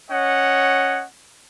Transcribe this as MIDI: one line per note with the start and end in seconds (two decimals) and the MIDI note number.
0.10 1.05 61
0.10 1.05 73
0.10 1.05 75
0.10 1.05 78